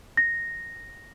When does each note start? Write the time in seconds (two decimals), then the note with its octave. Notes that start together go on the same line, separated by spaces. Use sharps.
0.17 A#6